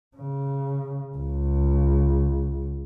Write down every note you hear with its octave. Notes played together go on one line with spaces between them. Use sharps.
C#3
C#2